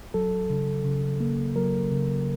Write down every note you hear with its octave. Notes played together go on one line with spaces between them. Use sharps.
F#3 A4
C#3
C#3
A#3
F#3 A#4
C#3